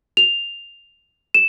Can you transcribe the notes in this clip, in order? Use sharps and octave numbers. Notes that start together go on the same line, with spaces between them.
F7
E7